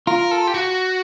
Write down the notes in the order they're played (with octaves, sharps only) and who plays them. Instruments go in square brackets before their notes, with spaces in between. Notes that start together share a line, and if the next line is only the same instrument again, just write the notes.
[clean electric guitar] F4 [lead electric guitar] A#4
[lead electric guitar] A4
G4
F#4